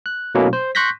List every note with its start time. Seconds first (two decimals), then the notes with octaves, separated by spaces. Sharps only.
0.06 F#6
0.35 B2 F#3 A3 A#3 C#4 E4
0.53 C5
0.75 C6 C#6 F#6 G6 A#6 B6